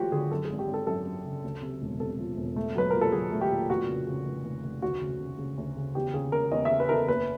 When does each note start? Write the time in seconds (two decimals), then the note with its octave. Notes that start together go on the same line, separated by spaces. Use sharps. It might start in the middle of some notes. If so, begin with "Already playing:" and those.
Already playing: F3 A3 F#4 G4
0.12 D3 G#4
0.31 F#2 A4
0.45 G#4
0.50 G#1
0.59 G4
0.68 G#1
0.74 A4
0.87 F#2 A4
1.05 F#2
1.25 C#3
1.44 D2
1.62 C3
1.82 E1
2.00 C3 A4
2.19 F3
2.37 E1
2.56 A3
2.75 F#3 B4
2.90 A#2 A#4
3.01 A4
3.12 F#3 G#4
3.32 A3
3.41 G4
3.51 A#2
3.69 F1 F#4
3.89 C#3
4.07 C#3
4.25 F1
4.45 F1
4.64 F1
4.82 D2 F#4
5.01 C#3
5.20 C#3
5.38 C#3
5.57 D2
5.77 C#3
5.95 E2 G4
6.14 C#3 G#4
6.32 C#3 A#4
6.51 E2 D#5
6.65 E5
6.70 C#3
6.80 B4
6.89 E2 A4 A#4
7.08 F#1 B4